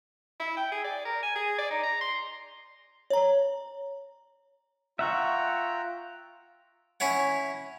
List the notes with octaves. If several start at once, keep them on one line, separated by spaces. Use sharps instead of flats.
E4
G5
G#4
D5
A#4
G#5
G#4
D5
D#4
A#5
C6
C#5 A#5
F4 E5 F#5 G5 A#5 C#6
C#4 E4 C#5 F#5